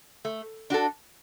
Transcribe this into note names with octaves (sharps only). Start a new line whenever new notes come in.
A3
D4 F#4 A4